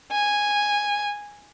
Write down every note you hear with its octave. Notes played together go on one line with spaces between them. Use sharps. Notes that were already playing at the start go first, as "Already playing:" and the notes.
G#5